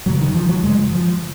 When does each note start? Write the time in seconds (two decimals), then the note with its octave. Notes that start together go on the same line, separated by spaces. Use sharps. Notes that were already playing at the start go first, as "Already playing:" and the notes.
0.06 F#2 C#3 F#3
0.21 D#3
0.35 F3
0.49 F#3
0.63 F#2 C#3 G#3
0.92 F3